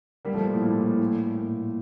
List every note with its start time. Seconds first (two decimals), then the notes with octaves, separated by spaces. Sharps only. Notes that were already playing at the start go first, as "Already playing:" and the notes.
0.25 G3 A#3
0.34 F3 A3
0.44 A#2
0.53 A2
0.63 A#2
0.82 A2
1.38 A#2